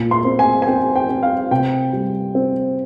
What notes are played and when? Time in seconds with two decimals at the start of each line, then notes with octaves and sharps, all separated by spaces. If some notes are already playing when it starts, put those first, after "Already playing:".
Already playing: A#2
0.11 C6
0.25 C4
0.39 G#5
0.62 G#5
0.67 C4 G5
0.96 G5
1.09 C4
1.23 F5
1.51 C3 G5
1.93 G3
2.35 C4